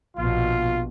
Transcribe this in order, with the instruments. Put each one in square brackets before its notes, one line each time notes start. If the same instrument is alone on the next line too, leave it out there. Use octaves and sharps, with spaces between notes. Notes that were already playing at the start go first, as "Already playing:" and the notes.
[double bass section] A#1 B2 [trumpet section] F4